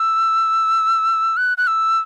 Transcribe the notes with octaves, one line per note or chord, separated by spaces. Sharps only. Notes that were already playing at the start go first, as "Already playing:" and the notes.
Already playing: E6
F#6
F#6
E6